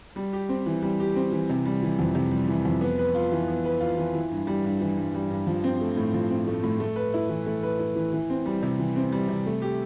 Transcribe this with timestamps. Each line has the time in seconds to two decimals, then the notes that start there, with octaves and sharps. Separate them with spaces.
0.16 G3
0.33 G4
0.49 C4
0.66 E3
0.83 G3
1.00 G4
1.16 C4
1.32 E3
1.49 C3
1.65 G3
1.83 E3
1.99 F2
2.15 C3
2.31 G3
2.48 E3
2.65 F2
2.81 B3
2.99 B4
3.15 F4
3.32 E3
3.48 B3
3.65 B4
3.81 F4
3.98 E3
4.15 E3
4.31 G2
4.47 G3
4.65 G2
4.81 E3
4.97 G2
5.15 G3
5.30 G2
5.47 F3
5.64 C4
5.81 A3
5.97 A2
6.13 F3
6.30 C4
6.47 A3
6.64 A2
6.80 A3
6.96 B4
7.14 E4
7.29 E3
7.46 A3
7.63 B4
7.79 E4
7.96 E3
8.13 E3
8.30 C4
8.46 G3
8.63 C3
8.79 E3
8.96 C4
9.12 G3
9.28 C3
9.46 A3
9.62 G4